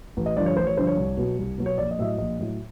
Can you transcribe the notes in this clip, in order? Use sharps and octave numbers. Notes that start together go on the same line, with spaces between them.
A1
D#5
G2 D3 F3 D5
C#5
A1 C5
C#5
G2 D3 F3 C5
C#5
C2
B2 F#3
C2
B2 F#3
C#5
A#1 D5
D#5
A2 F#3 E5
D#5
A#1 D#5
A2 F#3